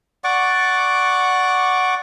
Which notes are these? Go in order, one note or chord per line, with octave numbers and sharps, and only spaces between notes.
D5 F#5 C#6 D6